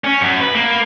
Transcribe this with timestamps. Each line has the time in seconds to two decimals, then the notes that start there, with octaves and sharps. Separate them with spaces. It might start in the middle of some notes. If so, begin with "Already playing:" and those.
0.04 C#4
0.21 F#2
0.41 B4
0.55 A#3